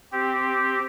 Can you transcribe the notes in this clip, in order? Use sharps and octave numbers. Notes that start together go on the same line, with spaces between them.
C4 G4